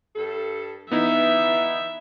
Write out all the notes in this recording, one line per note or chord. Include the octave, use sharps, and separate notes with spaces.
G2 A4
E3 B3 D#4 E4 E5